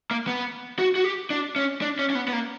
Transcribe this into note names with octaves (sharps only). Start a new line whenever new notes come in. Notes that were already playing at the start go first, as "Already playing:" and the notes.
A#3
B3
F#4
F#4
G4
D4
C#4
D4
C#4
C#4
B3
B3
A#3